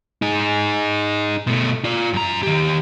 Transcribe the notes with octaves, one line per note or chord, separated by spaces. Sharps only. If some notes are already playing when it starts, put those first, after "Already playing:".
D#4 G#4
B2 A3
F4 D5
F#2 A#5
D#3 G4